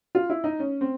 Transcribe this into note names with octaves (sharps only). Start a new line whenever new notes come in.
F4
E4
D#4
C#4
C4